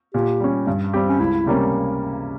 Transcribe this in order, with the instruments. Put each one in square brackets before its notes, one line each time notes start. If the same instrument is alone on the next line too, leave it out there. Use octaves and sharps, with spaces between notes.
[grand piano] A#2 [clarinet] G4
[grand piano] G3 C#4
G2
G3 C4 G4
[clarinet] C#4
[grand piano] C#2 [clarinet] E4
[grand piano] C3 G3 A#3 C#4